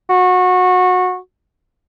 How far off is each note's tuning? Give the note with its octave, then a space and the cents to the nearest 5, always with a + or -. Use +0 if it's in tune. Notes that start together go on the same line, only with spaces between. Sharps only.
F#4 -20